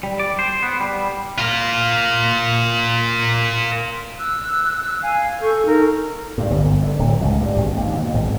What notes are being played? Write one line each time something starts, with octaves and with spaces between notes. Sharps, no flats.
G3
D5
C5
B3
G3
F4 A#4
E6 F#6
F5 G#5
A4 C#6 G6
D#4 A#4
G2
G1
G1
D3
D1
C#2
G2
G#1
D#2
B2
G#1